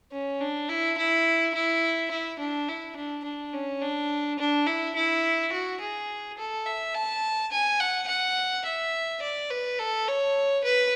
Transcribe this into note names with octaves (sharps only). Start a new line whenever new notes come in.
C#4
D4
E4
E4
E4
E4
D4
E4
D4
D4
C#4
D4
D4
E4
E4
F#4
G#4
A4
E5
A5
G#5
F#5
F#5
E5
D5
B4
A4
C#5
B4